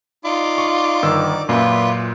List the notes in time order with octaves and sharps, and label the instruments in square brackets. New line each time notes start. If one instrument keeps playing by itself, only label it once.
[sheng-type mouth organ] D#4 D5 D6 [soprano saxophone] F4
[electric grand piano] C#6
G1 D#3 E6
[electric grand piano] F#2 A#2 [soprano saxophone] F4 [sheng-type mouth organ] B4 D5 E5